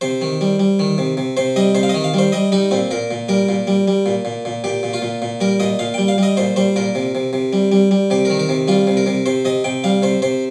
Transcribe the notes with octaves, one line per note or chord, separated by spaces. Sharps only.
C3 C5
D#3
G3
G3
D#3
C3
C3
C3 C5
G3 D#5
C3 C5
F5
D#5
D#3
F5
G3 C5
G3 D#5
G3 D#4
A#2 C4
A#2 A#4
A#2
G3 A#4
A#2
G3
G3
A#2
A#2
A#2
A#2 G4
A#2
F4
A#2
A#2
G3 A#4
A#2 D#5
A#2 F5
G3 G5
F5
G3 D#5
A#2 C5
G3 C5
A#2 A#4
C3
C3
C3
G3
G3
G3
C3 G4
D#3 A#4
A#4
C3
G3 F4
C3
A#4
C3
C3 C5
C3 D#5
C3 G5
G3 F5
C3 C5
C3 C5